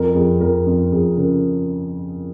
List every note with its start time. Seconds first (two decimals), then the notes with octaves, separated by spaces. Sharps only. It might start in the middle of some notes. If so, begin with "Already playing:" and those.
Already playing: F2 A#4
0.15 F2 G#4
0.40 F2 A#4
0.67 F2
0.92 F2 G#4
1.17 C#3 A#4